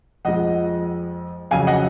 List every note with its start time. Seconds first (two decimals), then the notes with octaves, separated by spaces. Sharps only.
0.25 F2 F3 G#3 D#5 F#5
1.51 F2 C#3 F#3 F5 G#5
1.67 D#5 F#5